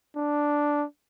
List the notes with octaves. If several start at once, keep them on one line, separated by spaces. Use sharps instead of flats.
D4